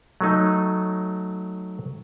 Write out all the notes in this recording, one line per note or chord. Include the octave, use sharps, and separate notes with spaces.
F#3 A3 D#4